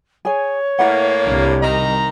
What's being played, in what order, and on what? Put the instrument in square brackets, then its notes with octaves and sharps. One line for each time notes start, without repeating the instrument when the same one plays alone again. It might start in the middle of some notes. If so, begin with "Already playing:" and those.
[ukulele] G#4 G#5 [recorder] C#5
[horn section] A2 A#3 [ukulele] E4 B4 F#5
[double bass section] C2 C3 G3 [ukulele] D4
[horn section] D#3 A#5 [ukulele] D#5